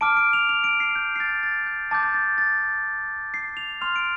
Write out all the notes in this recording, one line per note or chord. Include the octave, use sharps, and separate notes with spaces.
A5 D6 F6 D7
D7
F7
F7
D7
C7
G6
C7
A6
A6
G6
A5 D6 G6 A6
G6
A6
A6
C7
F7
C6 F6 F7
D7